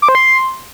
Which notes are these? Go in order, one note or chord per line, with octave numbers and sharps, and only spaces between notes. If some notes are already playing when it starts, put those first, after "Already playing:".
D6
C5
C6